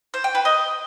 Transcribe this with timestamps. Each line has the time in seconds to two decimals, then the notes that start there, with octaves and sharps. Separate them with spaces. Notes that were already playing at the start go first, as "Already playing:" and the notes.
0.14 C5
0.24 G5
0.35 B4
0.45 D#5